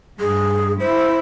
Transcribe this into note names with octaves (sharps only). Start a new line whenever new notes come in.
G2 G#4
E4 C5